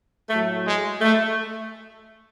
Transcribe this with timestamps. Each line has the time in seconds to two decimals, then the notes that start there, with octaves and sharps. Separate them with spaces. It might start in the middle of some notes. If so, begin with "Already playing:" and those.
0.30 A2 F#3 A3
0.65 G#3
1.01 A3